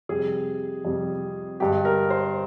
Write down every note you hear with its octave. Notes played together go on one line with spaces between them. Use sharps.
F2 C3 G3 G#4
F2 C3 G3
G2 D3 G#3 G4
A#4
C5